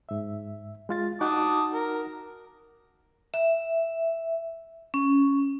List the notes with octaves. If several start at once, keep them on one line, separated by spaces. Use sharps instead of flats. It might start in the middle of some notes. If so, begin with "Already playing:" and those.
G#2 E5
G#3 F4 A6
D#4 F#4 F#5 A5 D6 D#6
A#4
E5
C#4